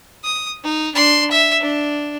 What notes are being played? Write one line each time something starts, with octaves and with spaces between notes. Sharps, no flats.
D#6
D#4
D4 C6
E5
D4